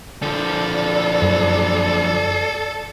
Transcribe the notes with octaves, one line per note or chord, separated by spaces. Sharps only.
D3 F3 A4 D5
F#2